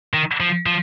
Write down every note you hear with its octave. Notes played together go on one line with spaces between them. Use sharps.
D#3
F3
F3